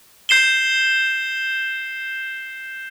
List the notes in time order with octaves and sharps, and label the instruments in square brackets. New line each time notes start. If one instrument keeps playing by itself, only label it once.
[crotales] G6 C7 E7 G7